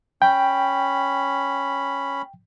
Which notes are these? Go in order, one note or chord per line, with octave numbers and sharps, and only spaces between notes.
C#4 G5 B5